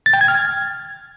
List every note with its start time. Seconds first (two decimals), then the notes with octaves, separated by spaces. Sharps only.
0.06 A6
0.13 G5
0.21 G#6
0.28 F6